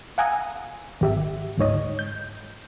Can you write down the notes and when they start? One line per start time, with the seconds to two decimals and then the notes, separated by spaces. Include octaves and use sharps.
0.18 F5 F#5 G#5 A#5 D#6 E6
1.01 G#1 G4 E5
1.58 G#1 D2 G#2 C#5 D#5
1.99 G6